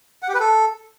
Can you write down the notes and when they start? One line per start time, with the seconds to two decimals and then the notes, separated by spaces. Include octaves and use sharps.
0.22 F#5
0.28 G4
0.34 B4
0.40 A4